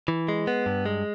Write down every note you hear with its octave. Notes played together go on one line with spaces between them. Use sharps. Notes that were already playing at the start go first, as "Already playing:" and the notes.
E3
G#3
B3
G2
G#3